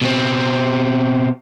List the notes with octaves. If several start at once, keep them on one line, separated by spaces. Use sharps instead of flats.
B2 C4